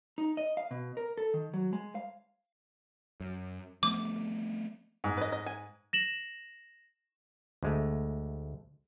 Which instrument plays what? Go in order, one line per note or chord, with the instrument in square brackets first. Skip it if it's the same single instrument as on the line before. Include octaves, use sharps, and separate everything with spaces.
[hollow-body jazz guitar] D#4
D#5
F5
B2
A#4
A4
D#3
F#3
G#3
F5
[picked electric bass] F#2
[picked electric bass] F3 A3 B3 [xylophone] D6
[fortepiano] G#2
[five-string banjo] B4 D#5
D#5
G#5
[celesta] A#6 E7 F#7
[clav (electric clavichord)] D2 G#3 A3